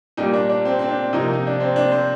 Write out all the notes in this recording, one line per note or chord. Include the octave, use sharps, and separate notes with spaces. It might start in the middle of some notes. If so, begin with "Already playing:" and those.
A#2 G3 A#3 D#4
D4
D4
C4
C4
D4
C3 F3 A#3 D#4
D#4
D4
C4
D4
C5